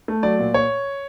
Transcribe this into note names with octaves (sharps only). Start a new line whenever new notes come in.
A3
F#3 D5
A#2
C#5